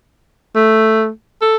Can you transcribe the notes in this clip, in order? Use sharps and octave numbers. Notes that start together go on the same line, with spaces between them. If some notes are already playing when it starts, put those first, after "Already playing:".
A3
A4